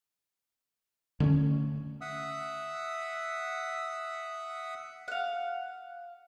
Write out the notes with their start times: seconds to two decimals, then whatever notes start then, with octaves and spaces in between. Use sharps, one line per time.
1.20 D3 A3 C4 C#4
2.01 E5 F#5 D#6 E6
5.08 F5 F#5